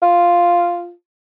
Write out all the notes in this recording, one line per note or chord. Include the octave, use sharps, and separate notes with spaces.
F4